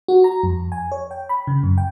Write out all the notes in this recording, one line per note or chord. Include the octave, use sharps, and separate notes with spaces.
F#4
A#5
F2
G#5
C#5
G5
B5
C#3
F#2
G5